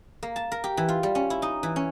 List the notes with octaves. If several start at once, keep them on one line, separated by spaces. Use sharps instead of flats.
A#3
A5
A#4
G4
E3
F4
G3
C#4
E4
D#4
E3
C#4